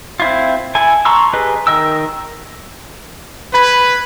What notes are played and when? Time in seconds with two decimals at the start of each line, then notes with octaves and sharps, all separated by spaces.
0.20 C4 E4 F4
0.75 E4 A4 G#5
1.05 A5 A#5 C6 C#6 E6
1.33 G4 G#4 B4 D#5
1.67 D#3 A#4 D#5 G5 E6
3.54 B4 B5 G#6 B6